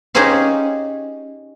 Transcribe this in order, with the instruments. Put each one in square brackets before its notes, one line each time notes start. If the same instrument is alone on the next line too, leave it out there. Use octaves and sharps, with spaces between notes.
[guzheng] C#4 D#4 G4 G#4 C5 F5